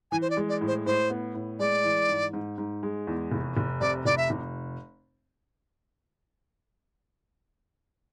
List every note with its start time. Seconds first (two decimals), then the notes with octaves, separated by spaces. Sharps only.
0.12 E3 G#5
0.22 C5
0.30 D5
0.37 G#3
0.49 D5
0.61 A2
0.67 C5
0.86 A2 C5
1.10 B3
1.35 A2
1.59 G#3 D5
1.84 E3
2.09 G#2
2.33 G#2
2.58 G#2
2.83 G#3
3.07 E2
3.32 F1
3.57 F1
3.80 C3 D5
4.05 F1 D5
4.18 E5
4.30 F1